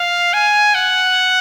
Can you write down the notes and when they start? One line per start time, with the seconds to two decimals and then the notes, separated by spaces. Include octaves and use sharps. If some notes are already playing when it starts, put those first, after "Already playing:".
Already playing: F5
0.33 G#5
0.75 F#5